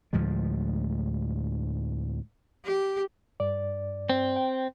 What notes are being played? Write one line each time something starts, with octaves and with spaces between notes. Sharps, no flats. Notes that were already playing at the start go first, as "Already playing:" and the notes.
D2 A2 F3 G#3
G4
G2 D5
C4
G5